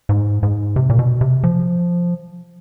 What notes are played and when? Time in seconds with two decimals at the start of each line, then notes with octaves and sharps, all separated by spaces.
0.09 G#2
0.43 G#2
0.76 C3
0.90 A#2
0.99 B2
1.21 C3
1.43 F3